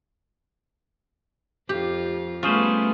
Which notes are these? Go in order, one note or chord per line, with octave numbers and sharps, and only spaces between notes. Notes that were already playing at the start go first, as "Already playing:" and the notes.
F2 F4 G4
G3 A3 B3 C#4 F4 G#4 C5